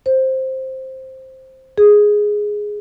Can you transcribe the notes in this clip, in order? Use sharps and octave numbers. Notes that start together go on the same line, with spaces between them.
C5
G#4